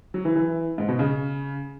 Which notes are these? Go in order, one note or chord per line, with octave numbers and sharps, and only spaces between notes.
F#3
E3
E3
G#2
B2
C#3